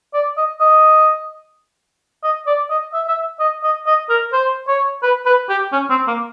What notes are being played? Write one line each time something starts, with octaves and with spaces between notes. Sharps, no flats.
D5
D#5
D#5
D#5
D5
D#5
E5
E5
D#5
D#5
D#5
A#4
C5
C#5
B4
B4
G4
C#4
C4
A#3